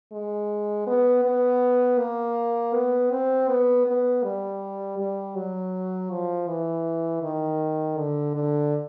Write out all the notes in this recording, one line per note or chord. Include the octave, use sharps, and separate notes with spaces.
G#3
B3
B3
A#3
B3
C4
B3
B3
G3
G3
F#3
F3
E3
D#3
D3
D3